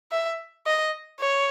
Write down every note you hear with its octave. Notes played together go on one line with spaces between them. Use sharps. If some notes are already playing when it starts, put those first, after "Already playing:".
E5
D#5
C#5